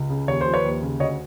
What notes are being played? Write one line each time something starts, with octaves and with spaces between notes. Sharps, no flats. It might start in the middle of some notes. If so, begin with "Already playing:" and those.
Already playing: C#2
C#3
D#2 C#5
C5
F3
B4 C#5
D#2
C#3
D2 C#5 D#5